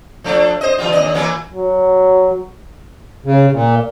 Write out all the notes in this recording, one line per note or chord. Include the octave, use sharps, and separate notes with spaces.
F3 A3 D4
C5 D#5
E3 G3 F4
D#2 D4 D#5
E3 F#3 A#3
F#3
C#3
A#2